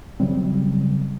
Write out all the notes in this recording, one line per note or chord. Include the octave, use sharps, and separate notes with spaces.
C#3 F#3 G3 C4